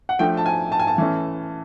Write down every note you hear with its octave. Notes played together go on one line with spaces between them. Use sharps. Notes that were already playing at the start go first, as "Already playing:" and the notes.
F#5
F3 A3 D4 G5
A5
G#5
A5
G#5
A5
E3 A3 C#4